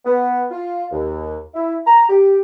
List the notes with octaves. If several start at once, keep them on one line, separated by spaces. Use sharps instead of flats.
B3
F4
D#2
E4
A#5
G4